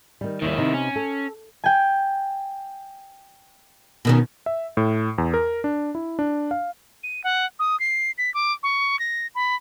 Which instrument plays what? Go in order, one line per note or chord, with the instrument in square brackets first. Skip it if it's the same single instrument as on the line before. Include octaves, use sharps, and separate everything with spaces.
[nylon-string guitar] D#3 G3
[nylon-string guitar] D#2 G3 [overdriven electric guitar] D#3 E4
[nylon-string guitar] C3 B3 D#4
[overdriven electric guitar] C#4
[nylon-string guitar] A4
[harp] G5 G#5
[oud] B2 D#3 C#4
[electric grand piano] E5
A2
E2
A#4
D4
E4
D4
F5
[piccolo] D#7
F#5
D#6
C7
B6
D6
C#6
A#6
B5